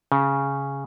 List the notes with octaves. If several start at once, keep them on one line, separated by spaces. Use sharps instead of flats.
C#3